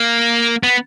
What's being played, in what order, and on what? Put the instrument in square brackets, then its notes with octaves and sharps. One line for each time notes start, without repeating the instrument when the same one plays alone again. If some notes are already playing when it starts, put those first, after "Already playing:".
Already playing: [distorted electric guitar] A#3
B3